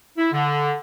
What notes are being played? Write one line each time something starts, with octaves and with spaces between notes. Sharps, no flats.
E4
D3